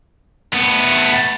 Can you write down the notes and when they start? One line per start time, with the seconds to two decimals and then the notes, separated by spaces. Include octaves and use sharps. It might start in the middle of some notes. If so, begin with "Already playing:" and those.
0.53 A3 B3